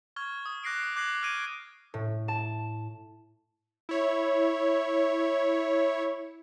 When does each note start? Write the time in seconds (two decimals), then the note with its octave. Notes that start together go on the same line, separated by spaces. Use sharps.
0.16 C#6 F6 G#6 G7
0.46 D#6
0.64 D6 F#6 A#6 C7 D7
0.83 D#6
0.96 D6 F#6 G#6 A#6 C7 F#7
1.23 F6 G#6 A#6 D7 D#7
1.94 A2
2.28 A5
3.89 E4 C#5